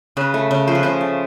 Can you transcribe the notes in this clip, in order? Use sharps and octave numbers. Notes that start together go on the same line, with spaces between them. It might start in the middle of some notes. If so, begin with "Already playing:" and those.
C#3 B4
A3
C#3
F3 C5
B4
C#3 C5
A3